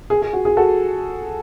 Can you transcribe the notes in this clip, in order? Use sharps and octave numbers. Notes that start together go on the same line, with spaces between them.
G#4
G#4
F#4
G#4
F#4 A4